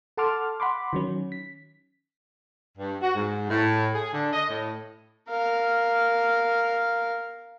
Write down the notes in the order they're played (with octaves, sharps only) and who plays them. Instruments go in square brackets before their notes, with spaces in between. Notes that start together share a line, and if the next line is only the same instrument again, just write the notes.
[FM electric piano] A4 F#5 A5 C6 D6 F6
F#5 B5 C6 D6
D#3 F#3 C#4
B6
[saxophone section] G2
F#4
G#2
A2
G#4
D3
D#5
A2
[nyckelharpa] A#4 F5